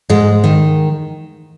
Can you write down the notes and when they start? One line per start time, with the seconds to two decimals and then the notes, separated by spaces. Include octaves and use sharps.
0.09 G#2 G#3
0.44 D#3